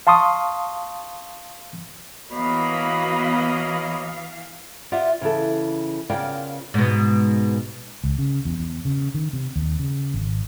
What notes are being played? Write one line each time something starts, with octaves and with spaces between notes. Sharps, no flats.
F5 A5 C6 C#6 D#6
E3 A#3 B3 F#4 C#5 D#5 F5 B5
F4 G4 D5 E5 F#5
C#3 E3 A4
C#3 B3 F4 A#4 D5 G5
G#2 B2
C#2
C#3
E2
E2
C#3
D#3
C3
D#2
C#3
G#1